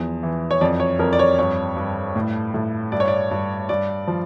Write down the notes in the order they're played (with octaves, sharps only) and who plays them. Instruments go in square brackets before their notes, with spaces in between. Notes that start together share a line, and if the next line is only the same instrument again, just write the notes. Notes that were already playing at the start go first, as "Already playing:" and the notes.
Already playing: [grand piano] E2 F3
E3
C#5
F2 D5
C#5
F2 A#4
D5
C#5
G2 C#5
G2
A2
A2
G2 D5
C#5
D5
G2
G2 D5
F3